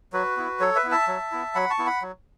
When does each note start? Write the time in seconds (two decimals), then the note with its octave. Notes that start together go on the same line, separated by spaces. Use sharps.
0.13 F#3 F#4 B4
0.37 B3 E4
0.60 F#3 A4 C#5
0.76 B4 E5
0.84 B3 E4
0.92 E5 A5
1.08 F#3
1.32 B3 E4
1.55 F#3 F#5 B5
1.70 A5 C#6
1.78 B3 E4
1.86 F#5 B5
2.02 F#3